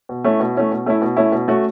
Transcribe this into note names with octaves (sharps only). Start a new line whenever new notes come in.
B2
A3 C#4 E4
B2
A3 C#4 E4
B2
A3 C#4 E4
B2
A3 C#4 E4
B2
A3 C#4 F#4